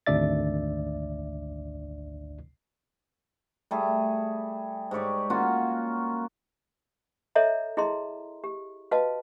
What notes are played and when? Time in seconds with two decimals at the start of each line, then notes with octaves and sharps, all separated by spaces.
0.06 G#1 D2 D4 D5 E5 A6
3.71 G3 A3 G#4
4.91 G#2 G4 C#5 D5
5.30 A#3 C#4 F4 F#4
7.35 A4 C#5 D#5 E5 A#5
7.77 E4 G#4 D#5 A#5 C6
8.44 G4
8.91 F#4 B4 D#5 F5 A5